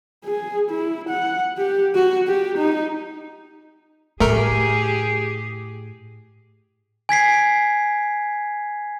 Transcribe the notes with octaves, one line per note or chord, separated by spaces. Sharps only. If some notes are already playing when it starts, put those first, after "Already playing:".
G#4
E4
F#5
G4
F#4
G4
D#4
A2 A3 G4 G#4 A#4
G#5 G#6 B6 C7